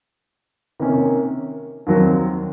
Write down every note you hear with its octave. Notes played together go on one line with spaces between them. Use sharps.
C3 D#3 A#3 C#4
D#2 D#3 F#3 C4